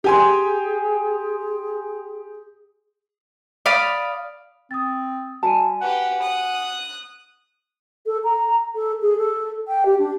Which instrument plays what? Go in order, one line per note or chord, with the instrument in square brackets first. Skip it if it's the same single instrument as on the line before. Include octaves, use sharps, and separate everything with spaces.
[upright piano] G4 G#5 C6 [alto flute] G#4
[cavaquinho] D5 F5 B5 D#6
[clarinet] C4 [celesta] D#6 A6
[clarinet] G3 [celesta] F#4 G#5 D#7 [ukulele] A5
[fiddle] G4 B4 [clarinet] F#5
[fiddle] D#6 F#6
[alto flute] A4
A#5
A4
G#4
A4
G5
G4
D4